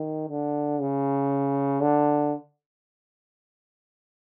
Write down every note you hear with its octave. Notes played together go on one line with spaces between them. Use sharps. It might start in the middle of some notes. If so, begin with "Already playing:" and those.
Already playing: D#3
D3
C#3
D3